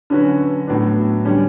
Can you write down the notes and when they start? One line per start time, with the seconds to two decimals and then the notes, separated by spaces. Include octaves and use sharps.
0.10 D3 F#3 C#4 F#4 B4
0.67 A2 F#3 B3 D4
1.25 D3 G3 C#4